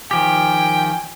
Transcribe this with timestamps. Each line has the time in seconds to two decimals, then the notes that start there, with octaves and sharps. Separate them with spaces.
0.11 D#3 F3 G4 G5 G#5